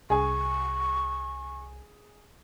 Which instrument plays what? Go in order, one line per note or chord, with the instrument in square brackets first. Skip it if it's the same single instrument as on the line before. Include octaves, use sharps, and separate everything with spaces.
[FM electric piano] C2 [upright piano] G#4 G#5 [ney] C#6